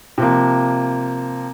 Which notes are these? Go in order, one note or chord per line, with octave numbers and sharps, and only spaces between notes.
C3 F3 A#3